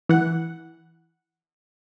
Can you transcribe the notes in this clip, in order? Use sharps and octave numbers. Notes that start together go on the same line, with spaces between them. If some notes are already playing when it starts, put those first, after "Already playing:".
E3 F#5